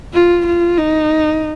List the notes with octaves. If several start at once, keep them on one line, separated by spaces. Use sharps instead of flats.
F4
F4
D#4